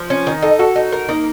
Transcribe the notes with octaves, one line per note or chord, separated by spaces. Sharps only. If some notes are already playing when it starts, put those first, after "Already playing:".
Already playing: F3
C#4
D#3
D#4 A4
F#4 A4
D#4
A#4
A#3 D#4